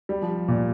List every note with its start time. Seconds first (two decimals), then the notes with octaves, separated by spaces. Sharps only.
0.09 G3
0.22 F3
0.48 A#2